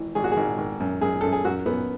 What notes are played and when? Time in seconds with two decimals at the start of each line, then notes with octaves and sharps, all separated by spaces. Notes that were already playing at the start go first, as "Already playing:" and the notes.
Already playing: G#1 E3
0.15 G#1 G#4
0.24 F#4
0.32 G#4
0.37 G#1
0.58 G#1
0.80 F#2
1.01 F#2 G#4
1.21 F#2 A4
1.32 G#4
1.45 F#2 F#4
1.66 F#2 B3